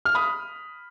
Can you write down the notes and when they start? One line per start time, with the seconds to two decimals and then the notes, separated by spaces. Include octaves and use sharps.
0.05 F6
0.15 B5 D#6